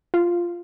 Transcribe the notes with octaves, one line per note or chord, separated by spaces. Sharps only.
F4